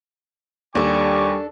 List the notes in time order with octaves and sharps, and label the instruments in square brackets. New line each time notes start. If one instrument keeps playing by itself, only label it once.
[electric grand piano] D#2 [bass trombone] G3 [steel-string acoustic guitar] D4 A4 [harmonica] G#5 C#6 D6